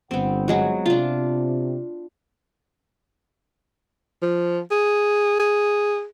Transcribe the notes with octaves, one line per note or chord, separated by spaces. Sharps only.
G1 B3 C4 F#5
F#3 G#3 F#4
C3 D4 F4
F3
G#4
G#4